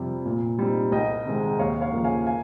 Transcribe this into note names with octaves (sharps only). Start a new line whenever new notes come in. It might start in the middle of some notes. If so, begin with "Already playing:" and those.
Already playing: F2 C3 G3
A#2
G3 C4 D#4
C2 D#5 G5
C3 D#3 G#3 D#4
D#2 C#5 F5
C#5 F5
C#3 F3 A#3
F5 G#5
F5 G#5